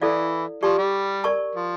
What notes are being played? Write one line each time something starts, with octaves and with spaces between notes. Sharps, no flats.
E3 E4 A4 D5 F5
F3 G4 D5 A5 C#6
G3
A#4 D5 A5 C#6
F3